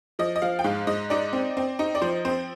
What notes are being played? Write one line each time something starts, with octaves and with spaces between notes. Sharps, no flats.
F3 D#5
D#5
F3 F5
G5
G#2 F5
G#2 D#5
D#4 D5
C4
C4
D#4
D5
F3 C5
C4 C5